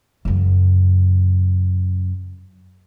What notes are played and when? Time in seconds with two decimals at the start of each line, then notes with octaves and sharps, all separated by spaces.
0.25 F#2 C#3